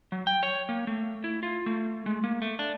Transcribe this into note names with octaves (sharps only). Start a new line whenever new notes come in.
F#3
G5
C#5
A#3
A3
E4
F4
A3
G#3
A#3
A3
D4